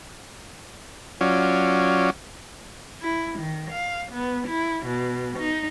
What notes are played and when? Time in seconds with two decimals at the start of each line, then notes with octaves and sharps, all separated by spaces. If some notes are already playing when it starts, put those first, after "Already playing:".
1.21 F#3 C#4 F4 D5
3.01 E4
3.39 D#3
3.71 F5
4.12 B3
4.48 E4
4.86 B2
5.39 D#4